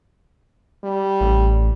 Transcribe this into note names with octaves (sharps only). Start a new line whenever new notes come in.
G3
A1